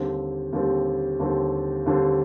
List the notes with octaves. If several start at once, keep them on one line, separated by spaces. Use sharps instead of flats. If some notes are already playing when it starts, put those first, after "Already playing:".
Already playing: D#2 D3 G3 C4
D#2 D3 G3 C4
D#2 D3 G3 C4
D#2 D3 G3 C4